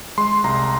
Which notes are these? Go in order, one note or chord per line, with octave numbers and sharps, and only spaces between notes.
G#3 C6
C2 A#5